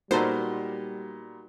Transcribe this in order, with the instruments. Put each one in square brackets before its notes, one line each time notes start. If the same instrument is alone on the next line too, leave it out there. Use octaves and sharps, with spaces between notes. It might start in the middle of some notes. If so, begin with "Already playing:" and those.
[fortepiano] A#2 B3 [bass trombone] G3 [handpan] D#4 F#4 A#4 [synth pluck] A4 C5